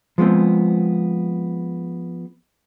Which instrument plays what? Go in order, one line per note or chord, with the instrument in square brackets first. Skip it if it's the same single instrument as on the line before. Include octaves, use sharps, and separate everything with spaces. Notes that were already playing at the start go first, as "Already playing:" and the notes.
[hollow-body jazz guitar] F3 G#3 B3 C4